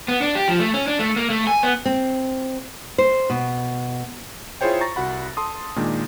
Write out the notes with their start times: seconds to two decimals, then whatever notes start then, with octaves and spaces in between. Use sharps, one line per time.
0.08 B3
0.22 D4
0.35 G4
0.48 F3
0.60 A3
0.74 C#4
0.87 D4
0.99 A3
1.16 A#3
1.30 A3
1.47 G#5
1.63 B3
1.85 C4
2.98 C5
3.30 B2
4.61 E4 F4 G#4 C5 C#5 G5
4.81 A#5 C#6 A6 A#6
4.96 C2 F#4 F#5 B5
5.37 A4 A5 C6 D#6
5.76 A#2 D#3 G#3 D4